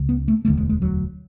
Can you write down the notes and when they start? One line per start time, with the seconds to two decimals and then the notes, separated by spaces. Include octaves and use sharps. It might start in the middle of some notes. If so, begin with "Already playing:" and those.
Already playing: C#2 C#3
0.09 B3
0.28 A3
0.45 E1 D2 D3 A3
0.57 G#3
0.69 G#3
0.82 F#3